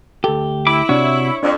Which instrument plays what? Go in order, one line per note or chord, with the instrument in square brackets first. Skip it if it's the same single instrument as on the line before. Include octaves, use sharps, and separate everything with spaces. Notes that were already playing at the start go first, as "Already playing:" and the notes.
[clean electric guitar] D2 G4 [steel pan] A4
[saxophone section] E4 [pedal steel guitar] B5 D6
[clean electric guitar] C3 F#4 [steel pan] D4 [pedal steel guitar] C#5
[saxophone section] F2 [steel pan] D4 D5